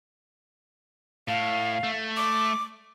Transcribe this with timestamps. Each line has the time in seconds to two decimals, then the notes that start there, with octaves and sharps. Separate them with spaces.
1.28 A2 F5
1.84 A3
2.17 D6